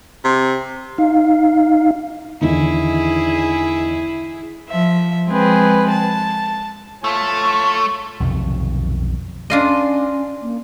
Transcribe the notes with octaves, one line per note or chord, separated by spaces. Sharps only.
C3
D#4 F5
E2 D3 D#3 E4 G#4
F3 E5
F3 G#3 C4 G#4 B4
A5
A3 F4 C#5 A5
B1 F2 C3 D#3
C#4 D4 F4 D#5
A#3